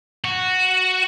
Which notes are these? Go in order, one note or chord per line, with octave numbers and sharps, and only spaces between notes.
F#4